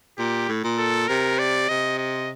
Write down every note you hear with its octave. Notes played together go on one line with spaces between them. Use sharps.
A#2 G4
A2
A#2
A4
C3 A#4
D5
C3 D#5
D#5